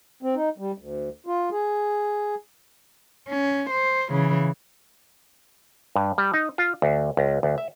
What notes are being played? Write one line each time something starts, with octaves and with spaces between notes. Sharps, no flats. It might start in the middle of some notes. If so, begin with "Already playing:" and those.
C4
D#4
G3
D2
F4
G#4
C#4
C5
C#3 E3
G2
G3
D#4
F4
D2
C#2
D2
E5